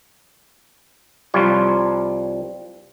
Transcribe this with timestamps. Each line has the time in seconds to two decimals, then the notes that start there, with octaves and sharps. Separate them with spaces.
1.34 C2 F3 G3 F4 C#5